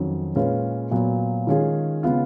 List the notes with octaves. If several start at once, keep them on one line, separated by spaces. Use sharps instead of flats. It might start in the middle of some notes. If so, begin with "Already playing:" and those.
Already playing: F2 D#3 F#3 C#4
A#2 G#3 C#4 F4 B4
A#2 F#3 B3
D#3 G#3 C#4 F4 G#4
C#3 G#3 B3 F4